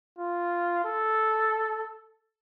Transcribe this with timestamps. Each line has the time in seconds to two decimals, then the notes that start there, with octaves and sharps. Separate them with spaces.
0.19 F4
0.84 A4